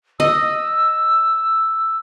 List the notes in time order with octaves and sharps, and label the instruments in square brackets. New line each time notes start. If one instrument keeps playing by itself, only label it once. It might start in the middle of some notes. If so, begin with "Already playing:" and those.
[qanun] D#5 [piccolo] E6